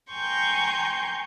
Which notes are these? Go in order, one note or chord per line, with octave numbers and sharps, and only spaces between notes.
G5 G#5 A#5 C6 C#6 G6